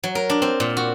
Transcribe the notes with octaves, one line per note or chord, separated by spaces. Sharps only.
F#3
A#4
D4
C4
A#2
F#4